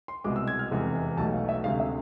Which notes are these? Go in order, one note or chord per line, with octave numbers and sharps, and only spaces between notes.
C6
C2 B2 G#3 D6
E6
G#6
F6
F1 E2 C3 G#3
B1 B2 A3 A5
F5
E5
D2 C3 G#3 F5
E5